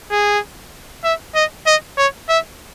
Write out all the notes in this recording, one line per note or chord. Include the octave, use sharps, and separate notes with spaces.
G#4
E5
D#5
D#5
C#5
E5